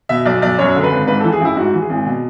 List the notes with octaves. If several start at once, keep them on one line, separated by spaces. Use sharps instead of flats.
B2 E5
B1 D5
B1 D5
F#2 C#5
D3
B4
G#1
G#2 B4
A4
E3
G#4
A1 E4
G#2 F#4
E3
G#4
G#1
B2